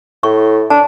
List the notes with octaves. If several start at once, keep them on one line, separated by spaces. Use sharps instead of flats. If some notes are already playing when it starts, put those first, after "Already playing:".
A2 C#6
D4 A5